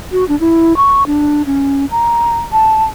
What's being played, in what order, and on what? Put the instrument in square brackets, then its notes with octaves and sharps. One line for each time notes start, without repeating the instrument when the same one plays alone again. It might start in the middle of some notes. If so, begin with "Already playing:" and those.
[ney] F#4
D4
E4
C#6
D4
C#4
A#5
A5